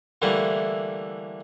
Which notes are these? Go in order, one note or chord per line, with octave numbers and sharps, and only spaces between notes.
D3 E3 G3 A3 A#3 E4